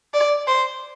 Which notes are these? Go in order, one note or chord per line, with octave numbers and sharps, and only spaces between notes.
D5
C5